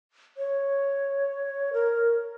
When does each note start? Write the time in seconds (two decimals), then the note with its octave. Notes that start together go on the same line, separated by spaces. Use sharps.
0.37 C#5
1.73 A#4